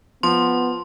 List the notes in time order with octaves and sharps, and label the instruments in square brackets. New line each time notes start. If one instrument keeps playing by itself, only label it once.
[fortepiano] F3 [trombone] B3 [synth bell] C6